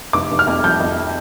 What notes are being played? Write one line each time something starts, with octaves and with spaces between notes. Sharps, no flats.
F1 D6
F1
F6
F2
F3 G6
F2